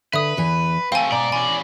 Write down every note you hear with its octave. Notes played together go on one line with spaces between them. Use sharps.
D3 B4 E5 D#6
E2 E3 G#5
A3 C4 F5 G5 G#5
G#2 B2 D5
E3 C#4 G#5